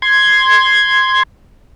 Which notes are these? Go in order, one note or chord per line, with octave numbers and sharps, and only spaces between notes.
C6 G#6